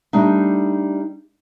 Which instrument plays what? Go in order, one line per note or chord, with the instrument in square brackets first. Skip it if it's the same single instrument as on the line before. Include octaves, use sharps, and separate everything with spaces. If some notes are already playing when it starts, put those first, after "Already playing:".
[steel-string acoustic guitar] G3 A3 D4 D#4